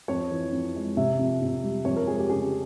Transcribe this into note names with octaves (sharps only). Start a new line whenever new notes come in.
F2 C#5
E3
F2
G#3
C3 E5
F2
C3
G3
F2 C#5
A#4
G#3 G#4
G4
C#3 G#4